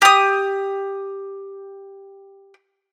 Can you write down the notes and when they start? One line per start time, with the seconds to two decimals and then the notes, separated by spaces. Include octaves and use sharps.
0.02 G4 D#6